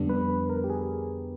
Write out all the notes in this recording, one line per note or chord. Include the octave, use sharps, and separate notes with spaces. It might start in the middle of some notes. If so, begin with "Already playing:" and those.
Already playing: F2 D3 G3 B3 D4
B4
B4
A#4
G4
G#4